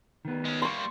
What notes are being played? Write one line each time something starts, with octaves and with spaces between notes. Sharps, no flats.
D#3 B3
G#3 C#4
G3 A#3 C6 C#6